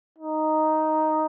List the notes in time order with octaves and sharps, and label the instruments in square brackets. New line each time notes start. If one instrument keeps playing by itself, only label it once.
[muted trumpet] D#4